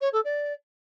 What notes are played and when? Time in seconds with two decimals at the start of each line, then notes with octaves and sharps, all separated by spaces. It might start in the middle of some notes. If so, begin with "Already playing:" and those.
0.01 C#5
0.13 A4
0.25 D5